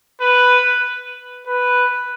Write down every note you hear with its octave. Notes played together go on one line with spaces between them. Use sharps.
B4
B4